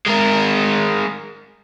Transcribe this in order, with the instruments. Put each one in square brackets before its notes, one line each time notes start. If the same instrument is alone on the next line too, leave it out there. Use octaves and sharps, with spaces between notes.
[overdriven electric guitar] G#3 A#4